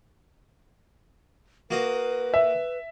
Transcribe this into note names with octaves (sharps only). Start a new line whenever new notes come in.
A#3 F#4 B4 D#5
E5